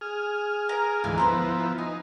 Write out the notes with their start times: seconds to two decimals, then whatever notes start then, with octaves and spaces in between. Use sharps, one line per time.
0.01 G#4 F6
0.69 A#4 A#5
1.04 D2 G#2 E3 F5 G#5
1.18 F3 B3 E4 B4 C5 A#5
1.78 D#4 G#5